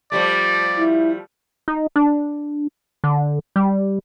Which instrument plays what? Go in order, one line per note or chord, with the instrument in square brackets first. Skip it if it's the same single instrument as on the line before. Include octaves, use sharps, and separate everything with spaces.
[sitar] F3 G3 A3 [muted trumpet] D5
[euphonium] E4
[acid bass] D#4
D4
D3
G3